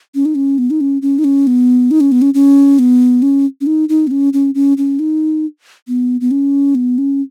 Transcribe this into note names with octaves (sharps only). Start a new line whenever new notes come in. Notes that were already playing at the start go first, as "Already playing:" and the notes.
C#4
D#4
C#4
B3
D#4
C#4
C#4
D#4
C#4
B3
D#4
C#4
B3
C#4
C#4
B3
C#4
C#4
D#4
D#4
B3
C#4
C#4
C#4
C#4
D#4
B3
B3
C#4
B3
C#4